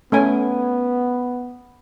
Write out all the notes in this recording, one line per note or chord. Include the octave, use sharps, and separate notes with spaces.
A3 B3 C#4 G#5